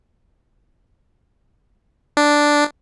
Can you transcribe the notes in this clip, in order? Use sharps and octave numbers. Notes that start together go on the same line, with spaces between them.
D4